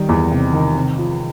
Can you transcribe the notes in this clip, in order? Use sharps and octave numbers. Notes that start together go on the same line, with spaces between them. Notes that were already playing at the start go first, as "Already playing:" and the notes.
Already playing: D#3 G3
E2
C3
D#3
C3
F3